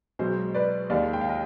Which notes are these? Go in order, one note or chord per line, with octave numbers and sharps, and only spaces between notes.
B1 B2 G#3 C5
B4 D5
D#2 D#3 G#3 D5 F5
G5
F5
D#5 G5